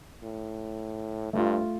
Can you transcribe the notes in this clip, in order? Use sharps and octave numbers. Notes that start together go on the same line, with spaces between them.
A2
G2 A3 F4